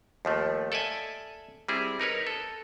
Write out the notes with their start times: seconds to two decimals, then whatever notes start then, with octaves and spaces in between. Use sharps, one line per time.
0.25 D#2 F3 A3
0.72 A4 D5 E5 G#5
1.68 G3 C4 E4 G#4
2.00 D#4 A#4 B4 C#5
2.27 A4